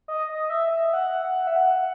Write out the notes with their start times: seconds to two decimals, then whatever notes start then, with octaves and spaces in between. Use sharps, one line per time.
0.08 D#5
0.29 D#5
0.50 E5
0.71 E5
0.93 F#5
1.24 F#5
1.47 E5
1.56 F#5